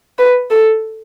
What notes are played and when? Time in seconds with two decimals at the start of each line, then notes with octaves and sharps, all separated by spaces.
0.19 B4
0.51 A4